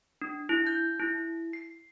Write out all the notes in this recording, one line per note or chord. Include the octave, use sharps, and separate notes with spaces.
D4
E4
G6
E4
C7